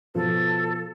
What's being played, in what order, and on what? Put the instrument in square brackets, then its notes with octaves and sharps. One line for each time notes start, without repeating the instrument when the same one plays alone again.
[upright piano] B2 F3 [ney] A4